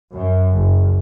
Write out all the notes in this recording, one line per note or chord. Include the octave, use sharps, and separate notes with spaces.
F#2
F#1